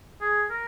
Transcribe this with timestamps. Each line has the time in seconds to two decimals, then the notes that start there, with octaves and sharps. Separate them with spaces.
0.21 G#4
0.50 A#4